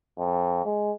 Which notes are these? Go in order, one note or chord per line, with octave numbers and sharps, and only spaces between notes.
F2
G#3